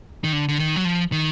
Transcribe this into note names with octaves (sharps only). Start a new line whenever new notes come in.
D#3
D3
D3
D#3
F#3
F3
D#3